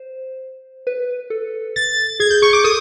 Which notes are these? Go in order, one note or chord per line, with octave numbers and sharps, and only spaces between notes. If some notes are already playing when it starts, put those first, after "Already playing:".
Already playing: C5
B4
A4
A6
G#4 G#6
G6
G#4 C#6
D6
A4 D#6